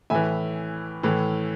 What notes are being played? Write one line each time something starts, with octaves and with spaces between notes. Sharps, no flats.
A2 E3 E5 G#5
A2 E3